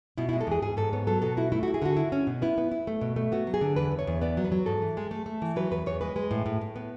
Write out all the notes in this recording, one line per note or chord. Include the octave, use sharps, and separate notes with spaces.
B2 E4
G#3 E4
A4
E2 G#4
G#2 G#4
G#2 A4
B3 C#5
F#3 A4
B2 A4
E4 F#4
A3 E4
E4 F#4
G#4
D3 F#4
E4
C#4
B2
B3 E4
B3
E4
A3
B2
A3
B3 F#4
F#3
G#4
D3
E2 B4
E2
C#5
E2
B3 D5
F#3
B4
F#3
G#2 A4
E3
G#3
A3
A3
E3
F#3 B4
E2 B4
E2 C#5
G#3 B4
G#3
A2
A2
A2
B3